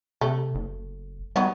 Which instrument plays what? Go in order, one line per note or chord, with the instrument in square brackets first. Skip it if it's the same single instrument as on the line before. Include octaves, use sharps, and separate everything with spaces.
[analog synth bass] C3 [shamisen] A3
[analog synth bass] F#1
[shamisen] D#3 F#3 B3 [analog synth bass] G3